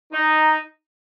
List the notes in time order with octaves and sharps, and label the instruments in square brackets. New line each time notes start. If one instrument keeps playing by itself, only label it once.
[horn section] D#4